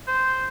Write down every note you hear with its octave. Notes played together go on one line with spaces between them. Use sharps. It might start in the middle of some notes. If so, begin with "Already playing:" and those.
C5